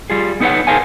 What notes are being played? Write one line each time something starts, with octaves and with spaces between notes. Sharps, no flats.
G3 F4 G#4
B3 D#4 A4 B4 C#5 F#5
G#4 A#4 C5 F5 G#5